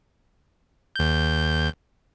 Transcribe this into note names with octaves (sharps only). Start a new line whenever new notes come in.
D#2 G6